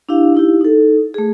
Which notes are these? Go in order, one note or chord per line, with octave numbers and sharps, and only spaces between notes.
D4 E4 G4 F5
D#4 E4 G4
D#4 A4
A3 G#4